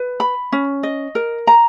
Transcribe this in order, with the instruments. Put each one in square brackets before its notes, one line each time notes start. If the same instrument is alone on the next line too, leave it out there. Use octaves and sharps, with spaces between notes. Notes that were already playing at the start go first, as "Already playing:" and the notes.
Already playing: [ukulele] B4
B5
C#4
D#5
A#4
A#5